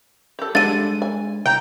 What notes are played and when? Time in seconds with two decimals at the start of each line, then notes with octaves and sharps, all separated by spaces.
0.39 G4 A4
0.55 G3 G#3 D4 A4 F#5 A6 D#7
1.02 G#5
1.46 C2 F#5 G5 A#5